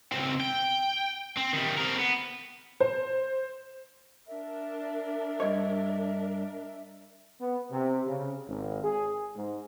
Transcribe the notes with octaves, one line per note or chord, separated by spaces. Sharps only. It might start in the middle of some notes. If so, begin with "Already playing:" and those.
C#2 C4
G5
C4
D#3 G3
C4 A#4
B3
C5
D4 A#4 E5
G2 C#5 D#5
B3
C3
C#3
G#1
G#4
G#2